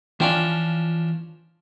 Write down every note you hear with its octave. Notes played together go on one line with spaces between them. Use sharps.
E3 F3 C#4 D4 F4 G5